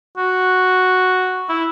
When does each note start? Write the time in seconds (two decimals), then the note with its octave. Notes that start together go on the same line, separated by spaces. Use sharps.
0.17 F#4
1.49 E4